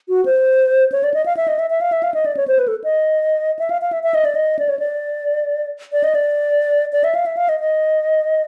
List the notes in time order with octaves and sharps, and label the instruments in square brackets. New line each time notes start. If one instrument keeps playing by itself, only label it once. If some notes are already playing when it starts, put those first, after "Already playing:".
[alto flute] F#4
C5
C#5
D5
D#5
F5
E5
D#5
E5
E5
F5
E5
F5
D#5
D5
C#5
C5
B4
A4
D#5
E5
F5
F5
E5
E5
D#5
D5
D#5
D5
C#5
D5
D5
D#5
D5
D5
E5
F5
E5
F5
D#5
D#5